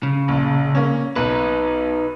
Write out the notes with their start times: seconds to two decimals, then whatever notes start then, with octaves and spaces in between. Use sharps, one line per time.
0.03 C#3
0.28 A#1
0.75 A#3 C#4
1.16 B1 D#4 B4